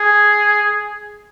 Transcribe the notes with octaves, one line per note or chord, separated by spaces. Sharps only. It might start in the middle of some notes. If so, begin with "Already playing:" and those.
Already playing: G#4